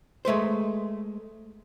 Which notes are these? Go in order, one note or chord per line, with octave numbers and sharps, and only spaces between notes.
G#3 A3 B4 C5